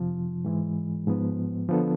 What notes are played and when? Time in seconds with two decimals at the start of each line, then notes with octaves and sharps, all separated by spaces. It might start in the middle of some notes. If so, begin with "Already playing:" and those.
Already playing: F2 C3 F3
0.44 G#2 E3 G#3
1.07 G#2 F3 B3
1.69 D3 F3 B3 D4 A4